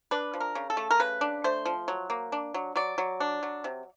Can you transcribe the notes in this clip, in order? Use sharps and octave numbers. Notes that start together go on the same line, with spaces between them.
D4 B4
F3
A#4
C#3
A4
A3
A#4
C#3 B4
D4
A3 C5
F3
F#3
A#3
D4
F#3
F#3 D5
F#3
D4
F#3
C3